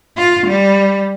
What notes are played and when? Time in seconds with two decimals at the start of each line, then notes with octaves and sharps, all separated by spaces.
0.17 F4
0.47 G3